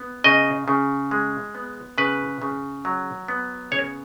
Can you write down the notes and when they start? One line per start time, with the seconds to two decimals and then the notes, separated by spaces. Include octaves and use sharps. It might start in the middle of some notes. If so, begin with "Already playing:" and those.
Already playing: B3
0.24 C#3 D#5
0.68 C#3
1.11 G#3
1.55 B3
1.98 C#3 B4
2.42 C#3
2.85 F#3
3.28 B3
3.71 C#3 C#5